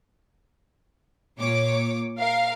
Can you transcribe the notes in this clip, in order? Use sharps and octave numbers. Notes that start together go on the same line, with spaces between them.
A#2 C#5 D6
A#4 F5